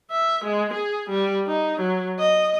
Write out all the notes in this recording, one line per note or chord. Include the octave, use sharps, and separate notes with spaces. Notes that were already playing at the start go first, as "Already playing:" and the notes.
E5
G#3
G#4
G3
D#4
F#3
D#5